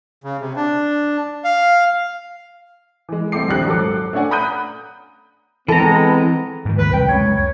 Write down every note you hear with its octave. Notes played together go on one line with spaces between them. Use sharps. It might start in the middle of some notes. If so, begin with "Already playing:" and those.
C#3
C3
D4
F5
E3 G#3
C2 A3 C4 A4 D6 C7
A#1 D#2 G4 F#6
G#1 F#3 A4 D6
A3 C#4 D4 C#5 F#5 G#5
A#5 B5 D#6 F#6 G6 D#7
E3 G#3 B3 C4 A4 A#5
G#2 D#3
D#2 B4
C2 G5
C#2 F#2 C#5
C#5